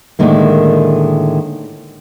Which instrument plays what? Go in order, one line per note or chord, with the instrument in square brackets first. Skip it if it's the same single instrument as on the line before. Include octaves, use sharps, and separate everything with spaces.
[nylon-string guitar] A2 D3 D#3 G#3 A#3